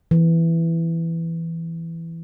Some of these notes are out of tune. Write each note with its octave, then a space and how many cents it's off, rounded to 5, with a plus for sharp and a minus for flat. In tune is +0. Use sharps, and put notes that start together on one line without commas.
E3 +5